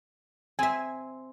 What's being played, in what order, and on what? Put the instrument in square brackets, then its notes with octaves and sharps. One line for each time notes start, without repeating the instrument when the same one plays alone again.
[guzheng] C4 E5 [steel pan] G#5